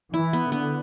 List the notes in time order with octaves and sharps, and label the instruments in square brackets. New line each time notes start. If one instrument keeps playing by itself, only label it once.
[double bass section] E3 [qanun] E4
[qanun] B3
[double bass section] D3 [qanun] B3